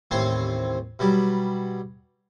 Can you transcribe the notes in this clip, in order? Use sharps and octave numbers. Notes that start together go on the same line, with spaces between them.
A1 D#2 C4 C5 C#5 C6
B2 F#3 G3 D6